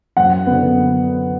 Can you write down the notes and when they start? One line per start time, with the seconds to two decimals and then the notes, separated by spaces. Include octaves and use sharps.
0.17 F#2 F#5
0.47 D3 B3